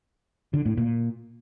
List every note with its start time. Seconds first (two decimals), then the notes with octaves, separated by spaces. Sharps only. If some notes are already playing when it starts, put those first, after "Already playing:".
0.54 D3
0.66 A2
0.77 A#2